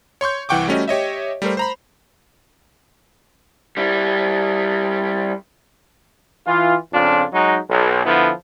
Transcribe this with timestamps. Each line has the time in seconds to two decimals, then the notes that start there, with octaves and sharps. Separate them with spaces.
0.21 C#5 C6 C#6 G6
0.49 C2 E3 F#5 G5 C#6 D6
0.68 G3 A3 C#4 F#4 D#5
0.88 G4 C#5 D#5 E5
1.42 G3 A3 A#4 C5
1.57 C5 A#5 B5
3.77 G3 E4
6.47 E3 F4
6.93 F2 C#3 D4 F4
7.33 F#3 G#3 D#4
7.69 B1
8.06 D3 F3 B3 E4